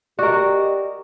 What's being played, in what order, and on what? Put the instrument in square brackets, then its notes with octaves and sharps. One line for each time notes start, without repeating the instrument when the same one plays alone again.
[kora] F#4 A#4 [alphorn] G4 [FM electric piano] D5 D#5